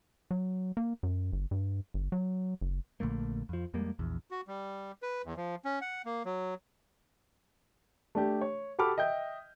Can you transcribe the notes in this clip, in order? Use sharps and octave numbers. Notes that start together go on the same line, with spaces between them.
F#3
A#3
F#2
G1
G2
G1
F#3
F#1
A#1 D3 A3 A#3
F2 F3
F2 G3 G#3 A#3
A#1 E2
F#4
G3
B4
E2
F3
C#4
F#5
A#3
F#3
A3 D4 G4
C#5
F#4 G4 A4 B5 D6 F6
D#5 E5 G5 G6